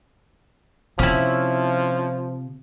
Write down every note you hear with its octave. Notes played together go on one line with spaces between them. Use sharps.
C3 F3 C#4 E4